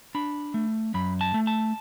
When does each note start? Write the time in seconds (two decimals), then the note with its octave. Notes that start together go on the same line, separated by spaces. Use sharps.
0.15 D4 B5
0.54 A3
0.94 F#2 B5
1.21 A5
1.34 A3
1.47 A5